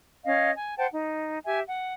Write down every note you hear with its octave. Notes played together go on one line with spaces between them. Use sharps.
C#4 D#5 F5
G#5
C5 F#5 G5 A5
D#4
G4 E5 G#5
F#5